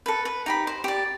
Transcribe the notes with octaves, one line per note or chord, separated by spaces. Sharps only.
A4 B4
B4
D#4 G4 B5
C5
G4 D5